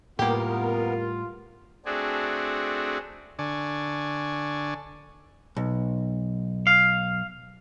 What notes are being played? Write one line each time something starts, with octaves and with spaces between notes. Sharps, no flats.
A2 G3 A#3 B3 F4 G4 A#4
A3 C4 D4 F#4 G#4
D3 D5 G#5 C#6
B1
F5